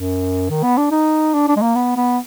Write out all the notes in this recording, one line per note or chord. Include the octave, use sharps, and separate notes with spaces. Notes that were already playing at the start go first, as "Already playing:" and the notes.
Already playing: F#2
D#3
B3
D4
D#4
D4
D4
G#3
A#3
B3
B3